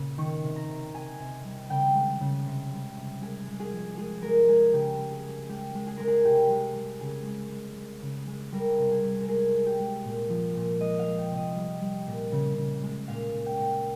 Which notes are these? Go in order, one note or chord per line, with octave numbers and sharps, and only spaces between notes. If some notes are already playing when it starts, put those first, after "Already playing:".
Already playing: A#2 C#3
D#3 C#6
C3
A#5
C3
C3 G#5
C3
G3
C#3 G5
G#3
C#3
C3
G3
C3
G#3 G#4
G#3
G#4
F3
G#3 G#4
G#3 A#4
G#3 G#4
C#3 G4
G#3
G#4
G#3
G#3 G4
G#3
G#4
G#3 A#4
G#4
C3 G4
G#3
G#3
C#3 G#4
G#3
G#3
G#3
C#3
G#3
G3 A#4
C3
G#4
C3
A#4
G#3 G#4
G#3
G4
G#3
A#2
F3
A#2
G#3 D#5
F5
G#3
G5
C3
D#5
G3
G3
A#2
C#3
C#3
G#3
A#2 F5
A#2
G5
A#2